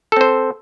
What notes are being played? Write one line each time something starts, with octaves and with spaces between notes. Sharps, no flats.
C4 A4 C5